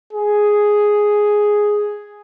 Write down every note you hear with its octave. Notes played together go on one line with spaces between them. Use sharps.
G#4